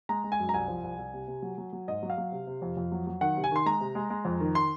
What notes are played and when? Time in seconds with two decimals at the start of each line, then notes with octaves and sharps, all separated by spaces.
0.09 G#3 A#5
0.24 G#3
0.32 G#5
0.39 F#2
0.49 A#5
0.54 C2 G#5
0.68 F3
0.84 C2
0.98 C2
1.14 C3
1.28 C3
1.42 F#3
1.58 F#3
1.73 F#3
1.88 G#2 D#5
2.03 F#3
2.10 F5
2.18 F#3
2.32 C3
2.47 C3
2.62 F2
2.77 F2
2.92 F#3
3.07 F#3
3.21 D#3 F#5
3.37 C3
3.44 G#5
3.51 D#3 C6
3.66 G#3 A#5
3.80 C3
3.95 G#3
4.10 G#3
4.25 F2
4.40 D#3
4.55 C6